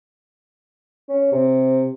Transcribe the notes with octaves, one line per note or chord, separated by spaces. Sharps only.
C#4
C3